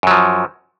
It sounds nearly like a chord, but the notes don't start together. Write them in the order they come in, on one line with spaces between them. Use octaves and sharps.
F#2 F#3 F3